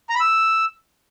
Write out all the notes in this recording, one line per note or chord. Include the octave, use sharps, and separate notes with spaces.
A#5
B5
E6